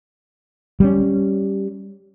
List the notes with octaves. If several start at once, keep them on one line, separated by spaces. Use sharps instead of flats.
G3 A#3 C#4